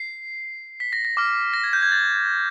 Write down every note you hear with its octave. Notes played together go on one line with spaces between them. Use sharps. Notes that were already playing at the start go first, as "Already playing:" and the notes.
Already playing: C7
B6
A#6
A#6
D6 F6
A#6
G#6
G6
G#6
A6